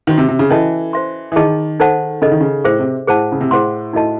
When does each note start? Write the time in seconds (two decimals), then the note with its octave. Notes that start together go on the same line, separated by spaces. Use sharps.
0.07 D#3 F#4 C5 E5
0.18 C3
0.29 C3
0.39 C#3
0.50 E3 C#4 F#4 A4 D#5 A5
0.93 C5 E5 C6
1.32 E3
1.36 D#3 G#4 D#5 A5
1.80 D#4 A4 C5 F#5 A5
2.22 C#3 D#4 A4 D#5
2.32 D#3
2.40 C#3
2.65 A2 G#4 C5 E5
2.80 C3
3.07 A2 G#4 C5 F#5 A5
3.32 C#3
3.41 C3
3.51 A2 G#4 C5 F#5 C6
3.93 A2 D#4 F#4 A4 D#5 A5